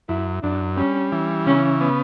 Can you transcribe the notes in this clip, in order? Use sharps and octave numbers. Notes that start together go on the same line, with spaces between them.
F#2 E4
F#2 D4
G3 C#4
E3
C#3 C#4
B3